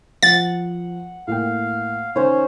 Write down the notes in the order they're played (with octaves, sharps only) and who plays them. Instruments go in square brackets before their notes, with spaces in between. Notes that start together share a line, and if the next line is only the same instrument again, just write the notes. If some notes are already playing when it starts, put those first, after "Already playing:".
[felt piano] F3 [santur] F#5 [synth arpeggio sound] A6
[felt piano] A2 A#3 G5 [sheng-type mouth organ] F5
[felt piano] D#3 [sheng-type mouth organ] C#4 [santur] C5 C#5